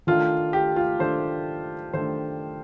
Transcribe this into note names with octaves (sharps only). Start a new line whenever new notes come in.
D#3 A3 D4 F4
G4
F4
D#3 A3 D4 C5
D#3 A3 D4 C5